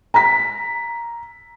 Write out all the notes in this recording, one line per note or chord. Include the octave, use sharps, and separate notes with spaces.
A#5 B6